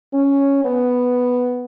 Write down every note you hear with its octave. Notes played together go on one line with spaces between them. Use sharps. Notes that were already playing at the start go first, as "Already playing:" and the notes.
C#4
B3